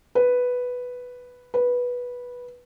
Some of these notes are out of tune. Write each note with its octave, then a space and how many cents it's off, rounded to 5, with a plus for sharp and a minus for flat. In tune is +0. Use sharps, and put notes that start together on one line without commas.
B4 +0
B4 -10